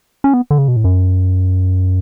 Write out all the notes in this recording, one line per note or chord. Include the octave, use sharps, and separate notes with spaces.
C#4
B3
D3
C#3
B2
A2
F#2